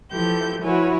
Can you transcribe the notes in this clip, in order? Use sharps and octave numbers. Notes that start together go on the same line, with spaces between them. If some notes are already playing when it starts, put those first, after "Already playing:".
E3 F3 G4 A4 G6
F3 E4 F#4 B4 C#5 G#5